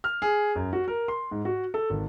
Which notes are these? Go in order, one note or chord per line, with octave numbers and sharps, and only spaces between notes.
F6
G#4
F#2
F#4
A#4
C6
G#2
F#4
A4
G#1